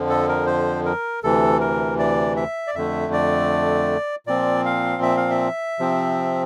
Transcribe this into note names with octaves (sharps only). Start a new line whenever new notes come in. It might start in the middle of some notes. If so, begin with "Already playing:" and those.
Already playing: F2 D3 F3
A4
A#4
C5
A#4
D2 C3 E3 A4
A#4
D5
E5
D5
F2 D3 A3 E5
D5
A#2 F3 C4 D5
F5
E5
F5
E5
C3 F3 C4